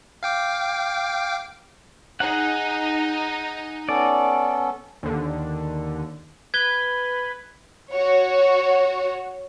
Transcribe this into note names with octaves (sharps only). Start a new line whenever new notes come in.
F5 G5 D6
D#4 G#4 F#5
B3 C#4 A4 D5
D#2 D3
B4 G#6 G7
F#4 C#5